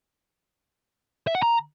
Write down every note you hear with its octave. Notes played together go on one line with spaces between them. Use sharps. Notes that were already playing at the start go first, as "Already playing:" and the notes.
E5
F#5
A#5